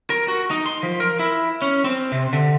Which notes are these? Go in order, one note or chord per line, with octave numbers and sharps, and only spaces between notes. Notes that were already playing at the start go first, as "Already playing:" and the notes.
A#4
F#4
D#4
C6
F3
A#4
E4
C#4
C4
C3
D3